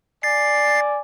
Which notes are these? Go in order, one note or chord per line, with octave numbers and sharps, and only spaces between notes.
D5 G#5 A6 C7